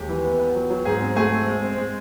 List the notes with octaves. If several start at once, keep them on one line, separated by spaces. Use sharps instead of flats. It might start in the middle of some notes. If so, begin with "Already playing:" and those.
Already playing: D#2 G#3 G4
E3
B3
B3
F#3
F#3
G#2 G#4
C4
A3 G#4
C4
G#3
C4
G#3